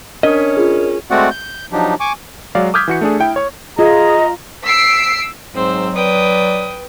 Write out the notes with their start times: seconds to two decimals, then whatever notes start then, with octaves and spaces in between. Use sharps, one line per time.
0.23 C#4 D4 A#4 D#5
0.57 F4 G#4
1.11 G#3 A3 C4 F#4 D5 F#5
1.31 G6
1.73 F3 F#3 D4 D#4 G4
2.00 G#5 C#6 D6
2.55 F#3 G#3 D5 F5
2.74 D6 D#6 F6 G6 G#6 B6
2.88 E3 F#4 C#7
3.01 A3 D4 G#4
3.20 E4 G5
3.36 C#5 C#6
3.79 F4 G#4 D#5 A#5
4.65 E6 B6 C7 D7
5.55 G#2 F#3 C4 C5 E6
5.95 B4 D5 G5 D#6